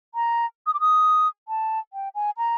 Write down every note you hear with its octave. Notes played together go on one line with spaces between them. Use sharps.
A#5
D#6
D6
D#6
A5
G5
G#5
A#5